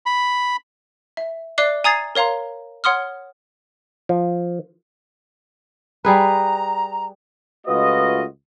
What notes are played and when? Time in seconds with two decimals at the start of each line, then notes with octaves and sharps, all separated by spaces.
0.06 B5
1.17 E5
1.58 D5 E5 D6 F#6 C7 G7
1.84 G#5 A#5 D#6 G#6 A6 C7
2.15 A#4 C#5 F5 A#5 C6
2.84 C#5 F#5 C6 D#6 F6
4.09 F3
6.05 G3 G#4 B4 A#5
7.67 C#2 A3 F4 F#4 B4 D#5